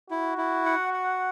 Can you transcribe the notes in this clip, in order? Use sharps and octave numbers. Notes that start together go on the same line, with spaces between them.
E4 F#4
E4
F#5
F#5